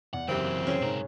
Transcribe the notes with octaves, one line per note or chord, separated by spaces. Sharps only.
E2 F#5
F#1 E3 F#3 C4 G4
C#4 G#4 C5
B1 G#2 C#3 A#4